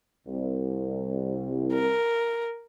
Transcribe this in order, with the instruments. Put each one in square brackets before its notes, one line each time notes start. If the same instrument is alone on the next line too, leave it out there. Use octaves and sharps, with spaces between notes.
[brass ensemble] C2
[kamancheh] A#4